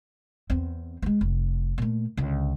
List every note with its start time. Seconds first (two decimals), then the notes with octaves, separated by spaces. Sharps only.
0.50 E2 C4
1.02 G#3 B3
1.21 F1
1.78 A#2 A3
2.17 C#2 D3